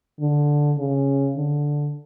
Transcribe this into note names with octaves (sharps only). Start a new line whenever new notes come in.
D3
C#3
D3